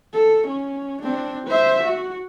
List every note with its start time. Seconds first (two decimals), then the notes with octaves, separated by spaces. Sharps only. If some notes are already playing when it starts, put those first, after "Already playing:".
0.13 A4
0.47 C#4
1.02 C4 D4
1.48 C5 E5
1.84 F#4